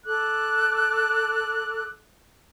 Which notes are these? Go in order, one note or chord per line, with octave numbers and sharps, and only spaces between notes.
A4 D6 F#6